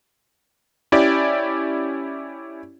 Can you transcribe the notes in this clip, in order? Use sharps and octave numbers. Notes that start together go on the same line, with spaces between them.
C#4 E4 G4 D5